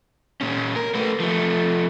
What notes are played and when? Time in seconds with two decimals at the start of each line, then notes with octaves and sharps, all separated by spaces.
0.41 A#2 C#4
0.76 A#4
0.95 A3 B4
1.20 F3 A3